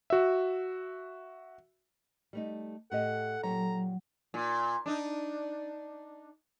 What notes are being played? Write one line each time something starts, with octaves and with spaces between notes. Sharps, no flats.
F#4 E5
G3 A3 D#4
A2 G4 A4 D#5 F#5
A#2 F#3 G4 C#5 A#5
A#2
D4 D#4